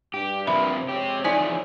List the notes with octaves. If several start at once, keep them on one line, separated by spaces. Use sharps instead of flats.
G2 G4
C3 F3 A#3 E5 B5
F2 G#3 C4 G4 C#5
E3 F3 D#4 G#4 D5 G#5